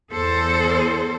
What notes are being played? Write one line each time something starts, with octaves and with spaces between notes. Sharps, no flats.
E2 A4 C5